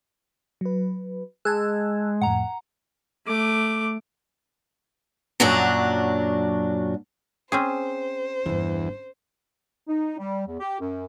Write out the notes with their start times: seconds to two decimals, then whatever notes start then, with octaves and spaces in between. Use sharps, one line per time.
0.61 F#3 B4
1.45 G#3 A5 E6 F#6 G#6
2.22 F2 A2 F#5 A#5
3.26 A3 D6
5.40 F#2 A#2 F#3 D4 F#4 A#5
7.52 C4 C#4 G#4 C5
8.46 G1 E2 D4
9.88 D#4
10.18 G3
10.47 E2
10.60 G4
10.80 F#2